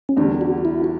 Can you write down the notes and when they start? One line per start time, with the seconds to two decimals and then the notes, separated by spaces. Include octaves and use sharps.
0.09 C#4
0.17 E2 D3 G3 D4
0.41 F#4
0.65 E4
0.84 F#4